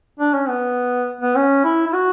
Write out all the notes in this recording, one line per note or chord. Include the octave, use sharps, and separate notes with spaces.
D4
C#4
B3
B3
C#4
E4
E4
F#4